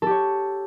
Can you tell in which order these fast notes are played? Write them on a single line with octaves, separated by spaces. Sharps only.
A4 G4 C#5